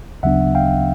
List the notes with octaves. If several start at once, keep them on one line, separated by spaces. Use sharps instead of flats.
D2 C#3 F#3 B3 D4 E5 F#5
F5 G5